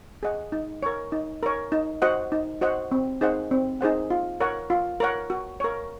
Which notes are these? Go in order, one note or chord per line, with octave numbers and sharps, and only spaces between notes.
G#4 D#5 F#5
D#4
A#4 C#5
D#4
A#4 C#5
D#4
F#4 C5 D#5 F#5
D#4
F#4 C5 D#5 F#5
C4
D#4 G#4 C5 F#5
C4
D#4 G#4 C5 F#5
F4
A#4 C#5 F#5
F4
A#4 C#5 F#5
F#4
A#4 C#5